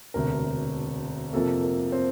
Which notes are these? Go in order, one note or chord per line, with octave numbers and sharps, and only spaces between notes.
E1 D2 C3 A#4
F2 C3 F3 A#3 A4
A#4
C4 C5